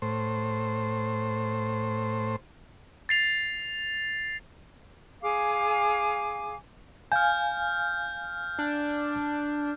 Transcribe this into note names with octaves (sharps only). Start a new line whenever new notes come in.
A2 C5
A6 C7 F7
G#4 F5 G#5 D6
F5 G#5 F6 G6
D4